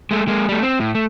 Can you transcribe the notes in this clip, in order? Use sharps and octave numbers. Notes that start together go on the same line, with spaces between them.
G#3 A3
G#3 A#3
G3 A3
C4
A2
A3